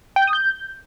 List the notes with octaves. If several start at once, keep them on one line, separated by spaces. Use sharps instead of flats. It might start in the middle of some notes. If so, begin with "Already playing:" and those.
G5
G6
D#6
G6